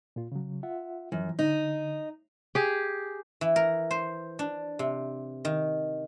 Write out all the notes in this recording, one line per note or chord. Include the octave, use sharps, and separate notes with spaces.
A#2 F4
C#3 F#3
F4 E5 F#5
F#2 E3 F3
D3 D#4
G4 G#4
E3
A#4
C5
D4
C3
D#3